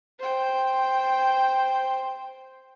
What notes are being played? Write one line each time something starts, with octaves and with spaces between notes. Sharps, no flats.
C5 G5